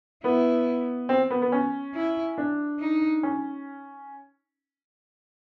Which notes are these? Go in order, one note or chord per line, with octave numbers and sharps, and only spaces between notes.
B3 E4
C4
B3
B3
C#4
E4
D4
D#4
C#4